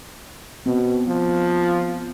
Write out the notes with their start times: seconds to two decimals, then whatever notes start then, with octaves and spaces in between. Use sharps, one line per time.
0.66 B2 B3 C4
1.07 F3